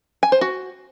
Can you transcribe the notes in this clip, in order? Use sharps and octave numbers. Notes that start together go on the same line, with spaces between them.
G#5
C5
F#4